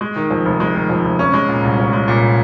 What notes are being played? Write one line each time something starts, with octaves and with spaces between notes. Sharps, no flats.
G#3
D#3
F2
F1
G#3
D#3
F2
F1
C#4
G#3
A#2
C2
C#4
G#3
A#2